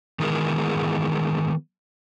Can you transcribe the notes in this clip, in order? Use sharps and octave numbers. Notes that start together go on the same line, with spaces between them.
D#3 E3 G#3 B3 G#4 A#4